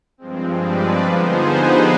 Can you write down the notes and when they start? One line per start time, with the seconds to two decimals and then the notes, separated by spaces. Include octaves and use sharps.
0.18 G2 F3 G#3 C4
0.61 B4 D5
1.04 D3 F3 B3 D#4 G#4 C5
1.47 G4 B4